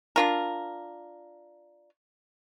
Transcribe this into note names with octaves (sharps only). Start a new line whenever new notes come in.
D4 F4 A#4